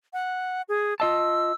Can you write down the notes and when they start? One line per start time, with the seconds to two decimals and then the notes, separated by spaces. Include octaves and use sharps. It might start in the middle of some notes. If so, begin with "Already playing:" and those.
0.13 F#5
0.69 G#4
1.00 F4 D#5 A5 E6